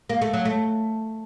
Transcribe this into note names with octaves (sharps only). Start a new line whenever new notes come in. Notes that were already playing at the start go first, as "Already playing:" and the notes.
A#3
A3
F#3
A3